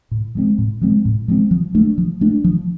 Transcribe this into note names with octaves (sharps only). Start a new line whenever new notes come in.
A2
F3 G#3 C4
A2
F3 G#3 C4
A2
F3 G#3 C4
F3
A3 D4
F3
A3 D4
F3